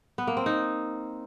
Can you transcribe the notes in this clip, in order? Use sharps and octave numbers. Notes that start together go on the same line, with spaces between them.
B3
A#3
C4
D#4